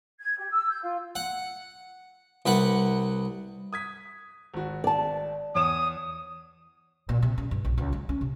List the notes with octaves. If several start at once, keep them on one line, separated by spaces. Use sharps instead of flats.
G#6
G4
E6
G6
F4
F#5
C2 B4 F#5
D#6 G#6 B6
G#1 F#4
D5 A5
E2 C#5 D#6 E7
A#2
C3
C#3
G2
A#1
C#2
G#3
C#4
C3